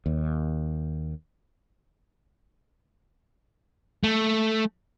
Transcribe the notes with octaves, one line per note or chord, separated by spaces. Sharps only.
D#2
A3